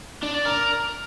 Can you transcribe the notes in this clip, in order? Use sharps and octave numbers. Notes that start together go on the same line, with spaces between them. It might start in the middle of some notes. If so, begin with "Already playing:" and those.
D4
D5
A#4